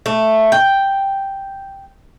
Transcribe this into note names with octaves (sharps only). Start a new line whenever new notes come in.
A3
G5